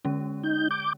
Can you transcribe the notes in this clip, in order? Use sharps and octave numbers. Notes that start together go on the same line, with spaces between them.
D3 G#3 C#4
D#4 G6
D6 G6